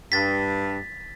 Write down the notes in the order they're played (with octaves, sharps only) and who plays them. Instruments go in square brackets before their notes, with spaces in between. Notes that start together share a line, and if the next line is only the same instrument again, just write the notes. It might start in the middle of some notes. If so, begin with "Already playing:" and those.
[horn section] G2 [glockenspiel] A6 B6